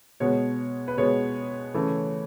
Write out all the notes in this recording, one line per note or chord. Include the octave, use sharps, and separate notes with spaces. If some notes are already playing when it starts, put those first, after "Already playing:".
B2 G#3 B3 C#5
B4
B2 G#3 B3 C#5
C#3 E3 A3